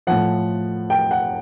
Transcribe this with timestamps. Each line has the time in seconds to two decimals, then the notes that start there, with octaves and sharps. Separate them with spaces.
0.07 A2 F3 F#5
0.90 G5
1.11 F#5